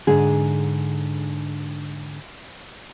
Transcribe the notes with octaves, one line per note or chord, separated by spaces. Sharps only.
G#2 D3 G#4